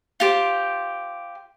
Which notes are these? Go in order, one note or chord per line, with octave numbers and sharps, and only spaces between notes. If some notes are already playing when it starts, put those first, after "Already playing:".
F4 G4 C5